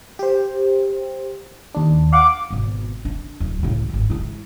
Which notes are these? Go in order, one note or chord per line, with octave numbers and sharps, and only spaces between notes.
G4 C5
D#2 D4
F5 F#5 D6
G#1 B2
D4
D1
C#2 A2
G#1 C#2
G#3 E4